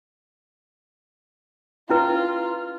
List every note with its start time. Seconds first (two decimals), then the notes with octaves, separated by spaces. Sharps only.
1.90 C#4 E4 F4 B4